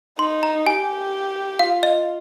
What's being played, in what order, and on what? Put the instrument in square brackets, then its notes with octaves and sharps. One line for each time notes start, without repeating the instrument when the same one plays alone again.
[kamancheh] D#4 [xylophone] C6
[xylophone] A#5
[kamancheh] G4 [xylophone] G#5
[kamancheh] F4 [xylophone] F5
[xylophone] D#5